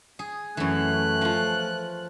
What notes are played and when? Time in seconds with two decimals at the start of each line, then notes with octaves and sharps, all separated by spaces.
0.19 G#4
0.57 F#2 E3 A3 F#6
1.21 F3 F4